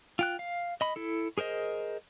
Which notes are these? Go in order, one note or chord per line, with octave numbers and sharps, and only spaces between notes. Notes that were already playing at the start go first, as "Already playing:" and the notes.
F4 G5 F#6
F5
D#5 B5
E4 A4
G#4 A#4 C5 D#5